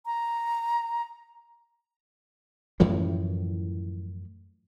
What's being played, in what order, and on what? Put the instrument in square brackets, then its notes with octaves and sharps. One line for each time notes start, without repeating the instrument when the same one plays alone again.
[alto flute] A#5
[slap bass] F#2 A2 E3 F3